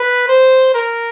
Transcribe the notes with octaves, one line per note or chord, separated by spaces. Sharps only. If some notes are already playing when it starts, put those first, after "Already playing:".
Already playing: B4
C5
A#4